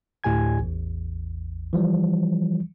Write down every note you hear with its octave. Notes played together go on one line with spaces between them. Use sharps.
D2 A2 G4 G#5 G#6
A1 E2
E3 F3 G3